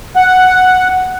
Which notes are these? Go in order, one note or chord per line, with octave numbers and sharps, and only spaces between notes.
F#5